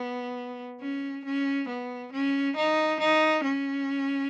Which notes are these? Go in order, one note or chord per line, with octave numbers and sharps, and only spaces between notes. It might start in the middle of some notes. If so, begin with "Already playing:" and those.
Already playing: B3
C#4
C#4
B3
C#4
D#4
D#4
C#4